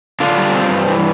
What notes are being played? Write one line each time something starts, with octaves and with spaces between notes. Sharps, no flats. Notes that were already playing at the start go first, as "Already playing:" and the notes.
D3 D4 F4
G3
C4
G2
E3